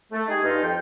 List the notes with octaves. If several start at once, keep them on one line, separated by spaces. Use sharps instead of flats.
A3
G#3 D#4 G4 G#4
G2 D#4 F4
F2 G5